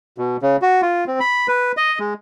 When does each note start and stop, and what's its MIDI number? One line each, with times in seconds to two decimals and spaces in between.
0.18 0.37 47
0.42 0.57 49
0.62 0.81 66
0.82 1.05 65
1.07 1.20 60
1.20 1.47 83
1.48 1.72 71
1.77 1.99 75
1.99 2.14 56